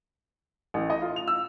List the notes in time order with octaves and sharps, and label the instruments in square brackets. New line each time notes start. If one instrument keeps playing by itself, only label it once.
[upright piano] A1
D#5
F4
F7
E6